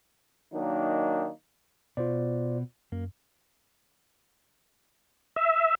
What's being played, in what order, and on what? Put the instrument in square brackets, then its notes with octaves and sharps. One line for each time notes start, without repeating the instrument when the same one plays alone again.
[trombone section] D#3 F#3 A#3 D4 D#4
[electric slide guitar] B2 [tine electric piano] F4 C5 D5
[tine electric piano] F#2 [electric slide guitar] A#3
[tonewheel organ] E5